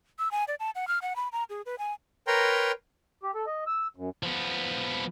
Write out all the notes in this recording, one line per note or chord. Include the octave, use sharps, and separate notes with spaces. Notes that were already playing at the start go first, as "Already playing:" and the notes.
E6
G#5
D5
A5
F#5
F6
F#5
B5
A#5
G#4
B4
G#5
A#4 B4 C#5 G5 A#5 C6
G4
A4
D#5
E6
F#2
F3 B3